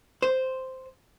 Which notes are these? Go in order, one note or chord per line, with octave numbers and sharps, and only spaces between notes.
C5